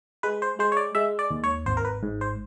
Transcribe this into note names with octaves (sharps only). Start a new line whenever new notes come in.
G#3 B4
C5
G#3 C5
C#5
D5
G#3 E5
D5
D#2
C#5
G#1 C5
A#4
B4
G#2
C5